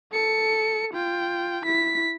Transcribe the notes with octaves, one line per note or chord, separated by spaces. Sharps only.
A4 C#7
F4 G5
E4 B6